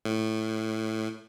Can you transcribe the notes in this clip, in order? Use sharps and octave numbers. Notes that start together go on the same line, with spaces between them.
A2